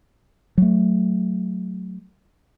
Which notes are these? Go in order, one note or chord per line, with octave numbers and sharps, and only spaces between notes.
F#3 A3